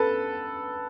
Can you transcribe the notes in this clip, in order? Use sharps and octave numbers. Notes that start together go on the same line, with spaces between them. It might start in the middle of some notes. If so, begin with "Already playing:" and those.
Already playing: A4 B4